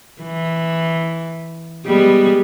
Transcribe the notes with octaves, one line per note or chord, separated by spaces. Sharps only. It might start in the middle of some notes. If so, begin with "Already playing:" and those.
E3
G3 G#3 B3